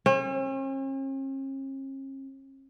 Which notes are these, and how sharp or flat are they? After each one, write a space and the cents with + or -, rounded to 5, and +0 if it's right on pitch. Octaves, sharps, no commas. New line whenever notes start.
C#4 -45